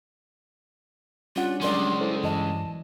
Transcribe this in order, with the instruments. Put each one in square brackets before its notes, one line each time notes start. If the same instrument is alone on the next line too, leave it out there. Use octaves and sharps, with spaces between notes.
[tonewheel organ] G3 D4 [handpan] C#4 F#5 [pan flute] F4
[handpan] F#3 A#4 D5 [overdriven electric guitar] G#3 C#4 [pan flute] C6
[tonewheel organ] E4 A4 C5
[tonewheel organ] G2 [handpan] E3 D#5 [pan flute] A5